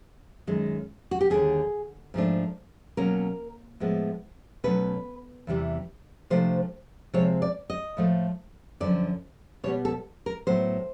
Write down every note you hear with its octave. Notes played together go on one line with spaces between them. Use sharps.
F#2 D#3 G#3
F#4
G4
D#2 D3 G3 G#4
G#2 F3 A3 D4
B2 F#3 A#3 C#4 A#4
A2 F3 G#3 B3
B2 F#3 A3 C#4 B4
E2 C3 E3 G3
C3 F3 A3 D4 C5
C3 F3 G#3 C4 C#5
D5
D#5
A2 F3 A3
F#2 D3 F3 D5
B2 G3 B3 C#5
A4
A#4
A2 F#3 B3 C5